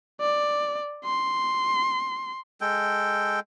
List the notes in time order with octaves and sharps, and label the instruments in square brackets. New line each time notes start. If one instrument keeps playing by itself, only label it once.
[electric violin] D5
C6
[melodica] G#3 A4 G5